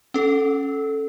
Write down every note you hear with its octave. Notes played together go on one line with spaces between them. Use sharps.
C#4 A4